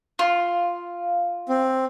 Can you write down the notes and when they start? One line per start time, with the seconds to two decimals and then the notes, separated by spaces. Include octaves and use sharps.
0.19 F4
1.49 C4